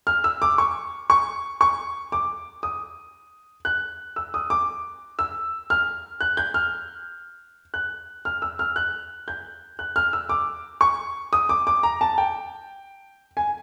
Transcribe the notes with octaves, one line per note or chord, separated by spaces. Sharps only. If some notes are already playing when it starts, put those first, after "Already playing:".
F6
E6
D6
C#6
C#6
C#6
D6
D#6
F#6
E6
D#6
D6
E6
F6
F#6
G6
F6
F#6
F6
E6
F6
F#6
G6
F#6
F6
E6
D6
C#6
D#6
D6
D6
A#5
A5
G5
G#5